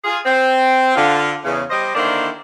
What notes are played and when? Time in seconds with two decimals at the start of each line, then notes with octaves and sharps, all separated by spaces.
0.04 F4 G#4
0.26 C4
0.96 D3 F4
1.44 E2 C#3
1.70 G3 G4 C5 D#5
1.95 D3 D#3 A#3 D4 E4 C5